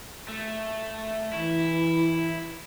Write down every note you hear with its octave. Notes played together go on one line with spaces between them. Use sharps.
A3
E3 E4